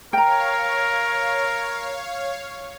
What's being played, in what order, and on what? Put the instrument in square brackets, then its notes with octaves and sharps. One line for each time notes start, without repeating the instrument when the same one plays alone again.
[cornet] A#4 [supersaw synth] C#5 F5 [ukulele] G5 A#5